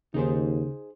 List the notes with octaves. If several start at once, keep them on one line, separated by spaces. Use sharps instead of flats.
D#2 C#3 D#4 G#4 C5